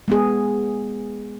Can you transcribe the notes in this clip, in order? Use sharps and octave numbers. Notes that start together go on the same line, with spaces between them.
G#3 B3 G#4